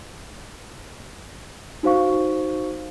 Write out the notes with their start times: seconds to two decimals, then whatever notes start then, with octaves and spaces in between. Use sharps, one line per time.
1.83 D#4 F#4 C5 F5 C#6